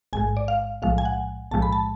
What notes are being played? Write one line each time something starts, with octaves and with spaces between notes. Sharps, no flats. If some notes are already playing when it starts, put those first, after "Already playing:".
A1 G#2 G#3 G#5
D5
F5
B1 A2 F3 G#3 F5
G#5
F#5
B1 A2 F3 G#3 A5
B5
A5